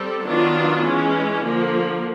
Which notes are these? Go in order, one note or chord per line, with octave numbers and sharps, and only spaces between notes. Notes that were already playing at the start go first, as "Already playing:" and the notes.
Already playing: G3 C4 A4
D#3 F#3 B3 D4 F4
E3 G#3 C#4
D3 F3 A#3